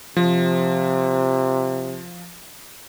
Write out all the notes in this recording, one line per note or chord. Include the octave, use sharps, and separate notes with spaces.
C3 F3